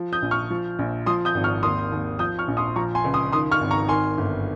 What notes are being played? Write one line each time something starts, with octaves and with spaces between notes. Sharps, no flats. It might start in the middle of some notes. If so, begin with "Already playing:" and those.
Already playing: F3
D#6 G6
A#1
C#6 F6
F3
A#1
F3 C6 D#6
D#6 G6
G#1
C#6 F6
D#2 C6 D#6
D#2
F3 D#6 G6
C#6 F6
A#1
C6 D#6
F3 A#5 C#6
G#5 C6
C#2
C6 D#6
D#3 C6 D#6
C#6 F6
G#1
A#5 C#6
D#3 G#5 C6
G1